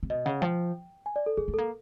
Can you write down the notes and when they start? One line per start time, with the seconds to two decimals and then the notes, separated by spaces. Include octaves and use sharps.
0.03 C3
0.10 B2 D#5
0.25 C#3 F#5
0.41 F3 G5
1.06 G#5
1.16 D5
1.26 A4
1.37 G#3 G#4
1.48 A3
1.54 A#3 A4